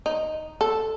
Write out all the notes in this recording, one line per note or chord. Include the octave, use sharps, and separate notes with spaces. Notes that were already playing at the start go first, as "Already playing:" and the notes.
D#4
A4